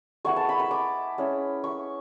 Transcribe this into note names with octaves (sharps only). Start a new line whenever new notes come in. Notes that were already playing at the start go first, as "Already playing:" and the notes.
G#3 B3 E4 C#6
A5
B5
B5
D6
G#3 C#4 E4
C#6